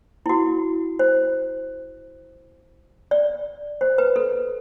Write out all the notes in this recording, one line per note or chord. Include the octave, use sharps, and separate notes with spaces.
E4
F#4
C5
D5
C5
B4
A4